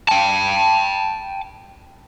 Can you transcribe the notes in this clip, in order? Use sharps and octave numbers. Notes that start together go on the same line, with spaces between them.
G5 A5